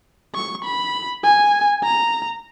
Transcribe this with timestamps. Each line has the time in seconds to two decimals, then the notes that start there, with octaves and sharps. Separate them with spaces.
0.35 C#6
0.64 B5
1.23 G#5
1.83 A#5